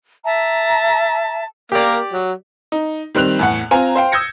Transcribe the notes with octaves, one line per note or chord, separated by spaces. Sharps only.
E5 A5 A#5
A#3 G4 A#4 D5
F#3
D#4
D#3 G3 C4 F#6 F7
E2 A2 F#5
C4 F4 G#5 A#5
C5 F5 G5
D#6 E6 G6 G#6 A#6 C#7